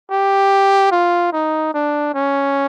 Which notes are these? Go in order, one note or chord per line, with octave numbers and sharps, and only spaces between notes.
G4
F4
D#4
D4
C#4